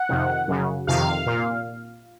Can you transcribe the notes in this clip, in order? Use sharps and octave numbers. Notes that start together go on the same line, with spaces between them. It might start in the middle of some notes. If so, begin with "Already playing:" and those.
Already playing: F#5
F2 C3 D#3
F#2 C#3
F2 C3 D#3 F5
A#2